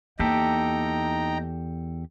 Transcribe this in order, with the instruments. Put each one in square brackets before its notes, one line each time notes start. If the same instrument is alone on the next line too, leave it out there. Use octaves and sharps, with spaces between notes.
[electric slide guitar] E2 G4 A4 [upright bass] A#3 [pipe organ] D#4 G5 A#5